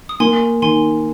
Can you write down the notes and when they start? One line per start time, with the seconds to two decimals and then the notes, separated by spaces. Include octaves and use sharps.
0.09 D#6
0.20 A#3 G#5 C6
0.62 D#3 G#5 C6